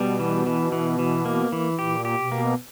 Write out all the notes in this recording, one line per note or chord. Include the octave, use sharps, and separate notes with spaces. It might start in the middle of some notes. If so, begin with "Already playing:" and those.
Already playing: B2 G3
E3
E3
E3
E3
A#3
E3
A#2 G4
G4
B2
A#3